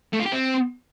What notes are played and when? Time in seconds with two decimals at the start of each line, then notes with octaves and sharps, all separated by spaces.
0.13 A3
0.20 F4
0.26 G4
0.32 C4